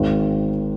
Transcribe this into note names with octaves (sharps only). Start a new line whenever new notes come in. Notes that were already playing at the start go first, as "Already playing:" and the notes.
Already playing: G#1 G#2 D#3